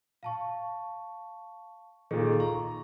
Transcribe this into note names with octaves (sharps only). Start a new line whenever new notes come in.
F5 A5 C#6
A#2 D#3 G#4 A4
A#5 C#6